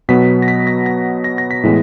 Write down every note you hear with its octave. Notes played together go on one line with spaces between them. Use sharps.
B2 F#3 B3 B6
A#6
B6
A#6
A#6
A#6
A#6
B6
A2 E3 G#3 B3